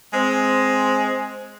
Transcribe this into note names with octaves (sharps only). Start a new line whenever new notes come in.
G#3 C4